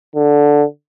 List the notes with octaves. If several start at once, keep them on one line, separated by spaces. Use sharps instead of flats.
D3